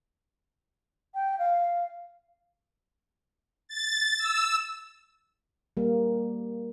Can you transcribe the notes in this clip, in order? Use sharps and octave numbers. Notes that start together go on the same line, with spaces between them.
G5
F5
A6
E6
G3 A#3